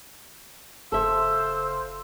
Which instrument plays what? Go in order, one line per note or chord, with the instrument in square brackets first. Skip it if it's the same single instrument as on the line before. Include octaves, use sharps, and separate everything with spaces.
[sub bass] F#1 [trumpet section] F4 C5 [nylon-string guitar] A4 E5 [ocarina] E6